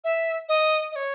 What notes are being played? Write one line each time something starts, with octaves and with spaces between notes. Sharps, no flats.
E5
D#5
D#5
C#5